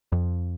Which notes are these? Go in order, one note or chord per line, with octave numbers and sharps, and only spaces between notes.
F2